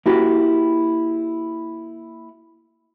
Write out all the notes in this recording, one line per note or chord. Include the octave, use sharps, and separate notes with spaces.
A#3 E4 F#4 G4